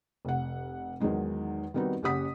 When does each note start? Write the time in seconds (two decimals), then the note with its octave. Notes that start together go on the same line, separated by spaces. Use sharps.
0.25 F1 F#5
1.00 E2 D#3 F#3 G#3 D#4
1.74 D#3 G3 B3 C4 D#4 F#4
2.03 F#1 C#4 G4 F#5 D#6 B6